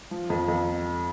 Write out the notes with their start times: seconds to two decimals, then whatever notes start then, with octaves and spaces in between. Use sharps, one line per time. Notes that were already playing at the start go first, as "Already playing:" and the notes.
0.11 F3
0.30 F2
0.48 F2